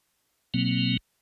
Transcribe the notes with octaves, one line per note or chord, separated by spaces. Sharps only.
B2 F#3 A#3 C4